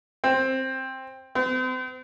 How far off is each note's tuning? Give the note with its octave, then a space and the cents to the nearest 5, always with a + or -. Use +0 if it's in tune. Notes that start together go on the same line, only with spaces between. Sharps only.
C4 +10
C4 -40